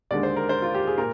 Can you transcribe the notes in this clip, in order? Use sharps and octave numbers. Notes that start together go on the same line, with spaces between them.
D#2 D3 G#3 D5
C5
A#4
C5
F4
G4
G#4
A#2 A#4